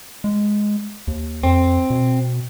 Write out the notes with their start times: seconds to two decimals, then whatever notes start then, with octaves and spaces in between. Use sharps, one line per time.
0.24 G#3
1.07 D#2
1.43 F2 C4
1.90 B2